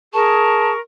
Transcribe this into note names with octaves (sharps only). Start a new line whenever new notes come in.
G#4 A#4 A5 C#6